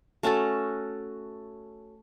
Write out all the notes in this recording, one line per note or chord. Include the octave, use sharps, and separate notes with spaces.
A3 C#4 F#4 A4